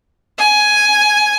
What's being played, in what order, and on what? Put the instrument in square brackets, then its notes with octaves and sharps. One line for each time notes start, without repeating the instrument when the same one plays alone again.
[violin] G#5